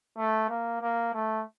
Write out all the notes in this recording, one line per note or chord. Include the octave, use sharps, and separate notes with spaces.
A3
A#3
A#3
A3